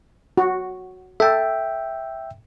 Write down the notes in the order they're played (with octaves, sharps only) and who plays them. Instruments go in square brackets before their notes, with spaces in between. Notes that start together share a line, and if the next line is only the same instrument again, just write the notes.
[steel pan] F#4
[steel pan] A4 [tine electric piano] E5 G5